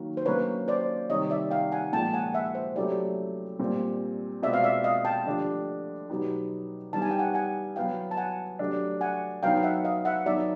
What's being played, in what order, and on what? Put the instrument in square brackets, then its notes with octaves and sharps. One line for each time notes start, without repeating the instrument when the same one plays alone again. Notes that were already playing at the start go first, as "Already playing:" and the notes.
Already playing: [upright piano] D#3 F#3 A#3 F#4
[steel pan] C5
[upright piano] D3 F#3 A#3 C#4 [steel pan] B4 C#5
[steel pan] C5 D5
[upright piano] C3 D#3 G3 [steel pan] C#5 D#5
[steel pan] D5 E5
F5 G5
F#5 G#5
[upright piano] A#2 F3 G#3 [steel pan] G5 A5
[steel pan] F#5 G#5
E5 F#5
C5
[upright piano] F#3 A3 C#4 E4 G4 [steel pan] D5 E5
[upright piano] A#2 G3 C4
[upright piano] B2 G#3 C4 F4 [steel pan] D5 E5
[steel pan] F5
D5 E5
D#5 F5
G5 A5
[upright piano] D3 F3 A3 D4 G4
B2 F#3 B3 D#4 G4
[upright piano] E3 G3 B3 D#4 [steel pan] A5
[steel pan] G#5
G5
F#5 G#5
F#5 G#5
[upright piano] F#3 B3 E4 [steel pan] F5 G5
[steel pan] A5
F#5 G#5
[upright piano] F#3 A3 D4 G4
[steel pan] F#5 G#5
[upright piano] F#3 B3 D#4 [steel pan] F5 G5
[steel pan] E5 F#5
D#5 F5
E5 F#5
[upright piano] F#3 B3 D#4 [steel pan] D5 E5